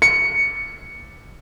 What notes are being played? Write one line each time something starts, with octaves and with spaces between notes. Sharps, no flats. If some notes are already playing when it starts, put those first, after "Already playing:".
C#7